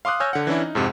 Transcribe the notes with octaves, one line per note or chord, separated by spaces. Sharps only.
F5 C6 D6 D#6 F#6
C#5 G#5 E6 F6 G6 A#6
D3 F#5
E3 C#4 D4 E4
D#4
F2 G#2 C3